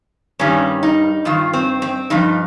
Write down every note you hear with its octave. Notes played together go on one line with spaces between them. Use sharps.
G2 D#3 G3 C#4
D#4
G2 D#3 F4
C4
C4
G2 F3 D#4